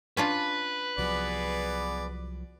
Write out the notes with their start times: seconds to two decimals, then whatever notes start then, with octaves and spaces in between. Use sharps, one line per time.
0.17 C#4 D4 F4 B4
0.98 C2 F3 F#3 B3 G#4 D5